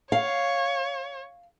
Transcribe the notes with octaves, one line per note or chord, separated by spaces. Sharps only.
C#5 F5